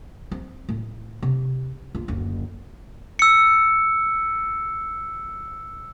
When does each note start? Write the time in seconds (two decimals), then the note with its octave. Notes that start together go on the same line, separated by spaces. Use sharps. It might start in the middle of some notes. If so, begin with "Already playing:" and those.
0.32 C4
0.69 A2
1.22 C3
1.95 D#2 F4
2.08 F#1 D2
3.19 E6 C#7